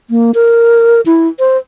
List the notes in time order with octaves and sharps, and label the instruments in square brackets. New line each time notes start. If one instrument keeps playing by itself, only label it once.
[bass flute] A#3
A#4
E4
C5